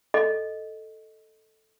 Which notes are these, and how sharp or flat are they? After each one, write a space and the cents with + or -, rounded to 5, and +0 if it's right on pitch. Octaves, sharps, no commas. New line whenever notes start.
A4 +0 D#5 +0